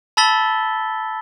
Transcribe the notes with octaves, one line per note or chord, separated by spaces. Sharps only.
A5 B5 E6 A6 B6 G7